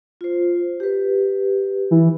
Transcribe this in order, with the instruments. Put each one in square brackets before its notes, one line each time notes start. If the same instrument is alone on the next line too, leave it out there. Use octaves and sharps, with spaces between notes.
[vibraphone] F4 C5
G4 B4
[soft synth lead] E3